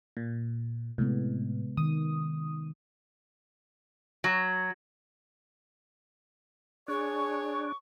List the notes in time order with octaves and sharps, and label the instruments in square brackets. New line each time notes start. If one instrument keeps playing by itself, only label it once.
[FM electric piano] A#2
[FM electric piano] A2 [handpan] C3 G#3 B3
[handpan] D#3 [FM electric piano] D#6
[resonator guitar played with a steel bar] F#3
[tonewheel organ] D4 [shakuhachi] G#4 [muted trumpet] C#5 [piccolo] C#6